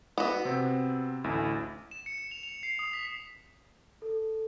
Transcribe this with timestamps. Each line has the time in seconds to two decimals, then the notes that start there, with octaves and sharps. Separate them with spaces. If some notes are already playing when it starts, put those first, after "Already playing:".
0.18 B3 F#4
0.45 C3 C4
1.24 A1 D2 E4
1.91 E7
2.06 C#7
2.18 C#7
2.31 F7
2.43 F7
2.63 C7
2.79 D#6
2.93 B6
4.02 A4